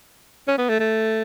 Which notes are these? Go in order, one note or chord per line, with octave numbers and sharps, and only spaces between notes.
C#4
B3
A3
A3